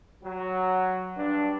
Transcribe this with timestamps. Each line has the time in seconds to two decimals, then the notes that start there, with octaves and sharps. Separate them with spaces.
0.23 F#3
1.16 G2 D4